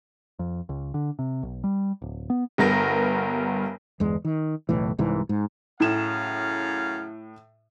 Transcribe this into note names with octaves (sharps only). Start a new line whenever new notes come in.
F2
C#2
D3
C3
B1
G3
D1
B3
G1 G2 B3 A#4 A#6
G1 E2 G#3
D#3
F#1 B1 A2 E3
C2 G#2 E3
G#2
F#2 A2 C#3 F5 E7